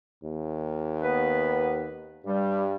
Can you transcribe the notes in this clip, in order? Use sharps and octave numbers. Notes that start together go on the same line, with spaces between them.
D#2
B3 B4
G2 G3